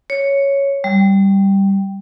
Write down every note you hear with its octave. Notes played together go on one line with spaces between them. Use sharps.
C#5
G3